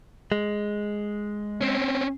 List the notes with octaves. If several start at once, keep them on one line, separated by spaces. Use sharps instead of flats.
G#3
C4 C#4